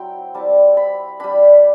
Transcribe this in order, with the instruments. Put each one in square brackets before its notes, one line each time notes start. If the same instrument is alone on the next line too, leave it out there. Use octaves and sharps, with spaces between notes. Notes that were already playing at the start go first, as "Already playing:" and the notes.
Already playing: [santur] F#3 C4 E4 G5
G3 C4 E4 A5
B5
G3 D4 B5